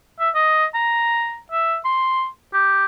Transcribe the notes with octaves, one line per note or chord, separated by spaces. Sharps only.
E5
D#5
A#5
E5
C6
G4